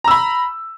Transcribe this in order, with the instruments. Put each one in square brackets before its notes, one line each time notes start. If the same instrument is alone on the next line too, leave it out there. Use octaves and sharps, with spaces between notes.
[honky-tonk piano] A#5
E6
B5